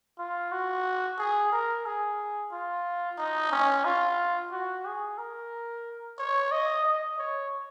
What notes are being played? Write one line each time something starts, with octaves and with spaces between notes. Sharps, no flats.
F4
F#4
G#4
A#4
G#4
F4
D#4
C#4
F4
F#4
G#4
A#4
C#5
D#5
D#5
C#5